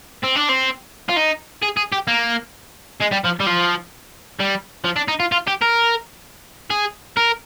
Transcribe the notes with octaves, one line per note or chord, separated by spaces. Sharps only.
C4
D4
C4
F4
D#4
G#4
G#4
G4
A#3
G#3
G3
F3
G3
F3
G3
F3
D4
D#4
F4
F4
G4
A#4
G#4
A#4